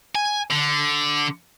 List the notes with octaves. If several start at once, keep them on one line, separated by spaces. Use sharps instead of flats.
G#5
D3